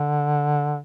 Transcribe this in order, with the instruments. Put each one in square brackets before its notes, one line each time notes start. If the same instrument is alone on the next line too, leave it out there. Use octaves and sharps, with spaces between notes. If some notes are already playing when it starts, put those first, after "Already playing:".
Already playing: [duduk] D3